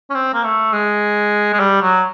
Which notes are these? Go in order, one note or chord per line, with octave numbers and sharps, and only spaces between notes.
C#4
C4
A#3
A3
G#3
G#3
G3
F#3